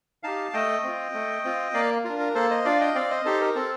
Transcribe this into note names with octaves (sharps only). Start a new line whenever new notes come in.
D#4 G4 F5 A5
A3 D#5 G5
C4 F4
A3
C4 F4
A#3 D5 F5
D4 F4 A#4
A#4
A#3 A4 C5
C5 D#5
D4 F4 D5 F5
D#5 G5
C4 D5 F5
C5 D#5
D#4 G4 A4 C5
A#4
C4 A4